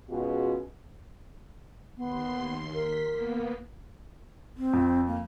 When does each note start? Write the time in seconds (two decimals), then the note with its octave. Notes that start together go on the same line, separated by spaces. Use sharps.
0.10 B2 G#3 C#4 F4 F#4 G#4
1.97 D#2 B3 C6
2.74 A#4 B6
3.11 A#3 B3
4.57 C4
4.73 F2
5.07 A#3